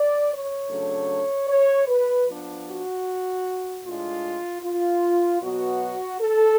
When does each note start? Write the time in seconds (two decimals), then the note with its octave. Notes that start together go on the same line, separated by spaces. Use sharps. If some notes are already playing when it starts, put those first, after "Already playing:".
Already playing: D5
0.30 C#5
0.69 C#3 F#3 A3 D4
1.48 C#5
1.87 B4
2.27 F3 B3 D4
2.66 F#4
3.84 A2 G#3 D4 F4
4.62 F4
5.41 B2 F#3 B3 F#4
6.20 A4